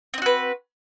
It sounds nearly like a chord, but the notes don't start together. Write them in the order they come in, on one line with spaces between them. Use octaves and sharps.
C4 D#4 F#4 B4